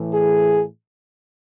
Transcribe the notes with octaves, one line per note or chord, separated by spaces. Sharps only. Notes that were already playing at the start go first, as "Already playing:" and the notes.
Already playing: A2 E3
G#4